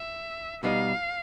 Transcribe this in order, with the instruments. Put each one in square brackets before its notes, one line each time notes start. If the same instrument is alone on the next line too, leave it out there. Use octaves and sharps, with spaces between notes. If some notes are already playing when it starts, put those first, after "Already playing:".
Already playing: [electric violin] E5
[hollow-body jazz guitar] B2 G3 B3 D#4 [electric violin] F5